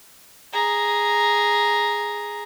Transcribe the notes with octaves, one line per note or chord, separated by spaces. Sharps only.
G#4 A#5